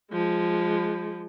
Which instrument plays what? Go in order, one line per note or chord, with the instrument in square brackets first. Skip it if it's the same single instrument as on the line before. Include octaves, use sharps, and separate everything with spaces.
[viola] F3 G#3